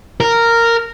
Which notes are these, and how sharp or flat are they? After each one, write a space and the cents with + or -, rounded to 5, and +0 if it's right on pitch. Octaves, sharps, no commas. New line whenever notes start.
A#4 -10